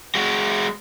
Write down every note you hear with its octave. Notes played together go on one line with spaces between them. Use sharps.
G#3 F#4